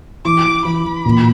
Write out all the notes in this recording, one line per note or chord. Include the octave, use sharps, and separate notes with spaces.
E3 D6
E3
E3 B5
E3
A#2